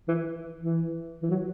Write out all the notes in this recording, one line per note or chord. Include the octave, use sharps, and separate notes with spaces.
E3
E3
E3
F#3